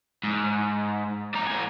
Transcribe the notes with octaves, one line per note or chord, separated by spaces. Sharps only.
G#2
D4 A#5
A2 G#5